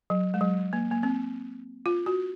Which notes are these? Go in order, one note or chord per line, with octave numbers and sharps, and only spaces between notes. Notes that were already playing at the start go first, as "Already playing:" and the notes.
F#3
G#3
F#3
A#3
A#3
C4
F4
F#4